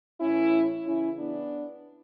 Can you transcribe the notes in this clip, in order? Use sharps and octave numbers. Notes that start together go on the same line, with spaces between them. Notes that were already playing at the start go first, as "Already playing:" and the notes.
A2 E3 C#4 E4
C#3 E3 C#4 E4
B3 D4